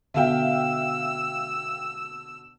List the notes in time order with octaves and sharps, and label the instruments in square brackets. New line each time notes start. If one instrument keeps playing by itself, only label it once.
[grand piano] B2 D3 [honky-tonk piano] E5 F5 G5 [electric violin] E6